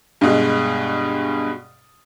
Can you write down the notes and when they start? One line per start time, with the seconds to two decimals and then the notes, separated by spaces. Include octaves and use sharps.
0.21 G2 B2 G#3